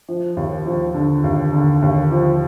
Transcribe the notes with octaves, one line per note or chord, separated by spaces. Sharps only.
F3
D#2
F3
D3
D#2
D3
D#2
F3